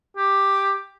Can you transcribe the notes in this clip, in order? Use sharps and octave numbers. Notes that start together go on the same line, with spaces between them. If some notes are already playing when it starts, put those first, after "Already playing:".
G4